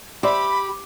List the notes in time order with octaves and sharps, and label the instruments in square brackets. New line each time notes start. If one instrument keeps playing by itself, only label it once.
[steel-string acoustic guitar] G4 [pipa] C5 D5 E5 [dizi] B5